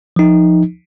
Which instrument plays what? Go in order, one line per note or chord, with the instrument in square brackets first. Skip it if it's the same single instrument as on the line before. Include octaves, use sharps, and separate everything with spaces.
[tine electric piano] F3 D#4